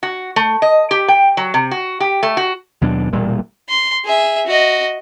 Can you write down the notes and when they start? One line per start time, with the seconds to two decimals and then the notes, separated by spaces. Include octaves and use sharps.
0.03 F#4
0.36 A3
0.62 D#5
0.91 G4
1.08 G5
1.37 F#3
1.54 C3
1.71 F#4
2.00 G4
2.23 A3
2.37 F#4
2.81 D#2 B2 F#3 D4
3.12 E1 A#2 G3 A#3
3.69 C6
4.05 G#4 E5
4.47 F#4 D#5